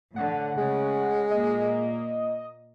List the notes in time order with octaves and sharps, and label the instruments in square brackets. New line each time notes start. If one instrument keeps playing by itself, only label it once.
[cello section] A2 D3 [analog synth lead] F#5
[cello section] C#3 [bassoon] G#3
[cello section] A#2 A#3 [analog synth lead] D#5